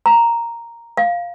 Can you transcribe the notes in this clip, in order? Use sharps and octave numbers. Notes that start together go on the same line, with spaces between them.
A#5
F5